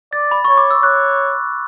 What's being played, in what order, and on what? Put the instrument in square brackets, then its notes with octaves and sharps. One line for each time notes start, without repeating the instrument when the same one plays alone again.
[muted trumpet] D5 [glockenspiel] A6
[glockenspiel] B5
[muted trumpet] C#5 [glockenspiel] C#6
[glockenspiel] D6
E6
[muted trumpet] C#5 [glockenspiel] F#6